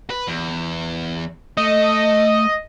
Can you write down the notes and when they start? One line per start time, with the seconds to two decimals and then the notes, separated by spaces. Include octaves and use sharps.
0.10 B4
0.28 E2
1.57 A3 D#5